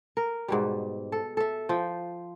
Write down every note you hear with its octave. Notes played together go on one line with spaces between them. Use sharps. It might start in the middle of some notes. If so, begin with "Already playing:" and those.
A#4
G#2 B2 G3
A4
A4 E5
F3 G5